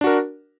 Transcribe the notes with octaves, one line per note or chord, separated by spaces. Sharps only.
D4 F#4 A#4